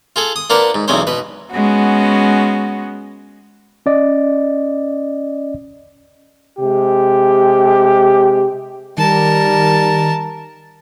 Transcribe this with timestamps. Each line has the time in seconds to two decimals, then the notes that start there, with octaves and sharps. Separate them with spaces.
0.16 F4 G#4 A4
0.36 D#6
0.50 A#3 D4 F4 A#4 B4 F#5
0.75 G#2
0.88 B1 E2 C4 C#4 C5
1.07 B2 B4
1.53 G#3 B3 C#4 F#4
3.86 C#4 D5 D#5
6.58 C3 G#3 G4
8.98 D#3 G3 A#4 A5